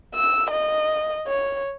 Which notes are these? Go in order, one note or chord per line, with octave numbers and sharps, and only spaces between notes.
E6
D#5
C#5